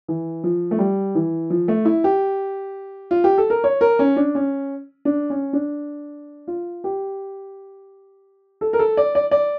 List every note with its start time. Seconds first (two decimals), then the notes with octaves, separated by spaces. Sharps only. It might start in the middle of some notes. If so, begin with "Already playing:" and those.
0.08 E3
0.44 F3
0.71 A3
0.79 G3
1.15 E3
1.50 F3
1.68 A3
1.85 E4
2.04 G4
3.11 F4
3.24 G4
3.38 A4
3.50 A#4
3.64 C#5
3.81 A#4
3.99 C#4
4.16 D4
4.35 C#4
5.05 D4
5.30 C#4
5.53 D4
6.48 F4
6.84 G4
8.61 A4
8.73 A#4
8.79 A4
8.97 D5
9.15 D5
9.31 D5